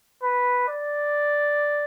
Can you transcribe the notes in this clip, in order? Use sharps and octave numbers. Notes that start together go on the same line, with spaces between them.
B4
D5